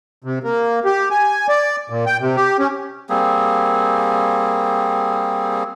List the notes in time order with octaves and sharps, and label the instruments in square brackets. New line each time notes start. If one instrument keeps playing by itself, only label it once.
[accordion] C3
A#3
G4
G#5
D5
A#2
G5
C3
G4
C#4
[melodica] G3 A#3 C4 G#4